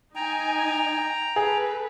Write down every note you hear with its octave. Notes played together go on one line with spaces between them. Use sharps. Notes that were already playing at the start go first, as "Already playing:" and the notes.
D#4 G5 G#5 A#5
G#4 A4 B4